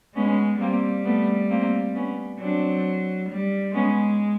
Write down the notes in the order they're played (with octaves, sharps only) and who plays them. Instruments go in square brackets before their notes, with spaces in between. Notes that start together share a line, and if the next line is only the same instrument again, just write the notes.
[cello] G#3 [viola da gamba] B3 C#4
[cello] G3 [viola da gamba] A#3 C4
[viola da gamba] A3 B3
A#3 C4
B3 C#4
[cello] F#3 [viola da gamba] C4 D4
[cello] G3
[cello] G#3 [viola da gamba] B3 C#4